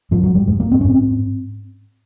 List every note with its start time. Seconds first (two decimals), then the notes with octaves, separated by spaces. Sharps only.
0.11 G#2 F3
0.23 F#3
0.35 G3
0.47 G#2 G#3
0.60 A#3
0.72 C4
0.81 C#4
0.85 G#2
0.90 C4